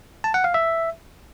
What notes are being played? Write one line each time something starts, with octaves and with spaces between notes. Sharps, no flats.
A5
F#5
F5
E5